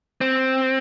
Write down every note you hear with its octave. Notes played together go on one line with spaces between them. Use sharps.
C4